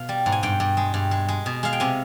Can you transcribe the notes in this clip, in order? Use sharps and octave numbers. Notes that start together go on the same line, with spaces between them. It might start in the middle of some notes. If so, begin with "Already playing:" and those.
Already playing: B2 F5
G3
G#2
G#5
G2 G5
G2
G#3
G2
G#3
G#3
B2
G#3 F5
G5
C3 G#5